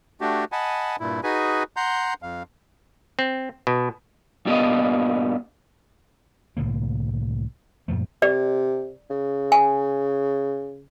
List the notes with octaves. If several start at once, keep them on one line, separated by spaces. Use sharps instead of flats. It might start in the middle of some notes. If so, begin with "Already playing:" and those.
A3 D4 F#4 G4
D#5 F#5 G#5 A5 B5
G2 A#2 E4
D#4 F#4 G#4 B4 G#5
F#5 A#5 C6 G6
F2 F5
C4
B2
G2 A#2 G3 A#3 B3 D#5
C2 A2 D3 A#3
F#2 A#2 F3 A3
C3 D5
C#3
G#5